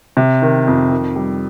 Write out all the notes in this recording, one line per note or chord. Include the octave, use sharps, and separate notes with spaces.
C3
D#3
F2
D#3
G3